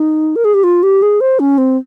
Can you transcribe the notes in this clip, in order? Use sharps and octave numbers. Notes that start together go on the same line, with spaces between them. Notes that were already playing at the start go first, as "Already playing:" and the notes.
Already playing: D#4
A#4
G#4
G4
F4
G4
G#4
C5
C#4
C4